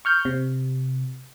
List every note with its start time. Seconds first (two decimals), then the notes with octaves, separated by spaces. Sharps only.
0.05 C#6 F6 G6
0.25 C3